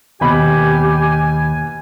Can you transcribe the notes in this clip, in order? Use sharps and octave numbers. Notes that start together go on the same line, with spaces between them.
D#2 B2 G4 G#5 B5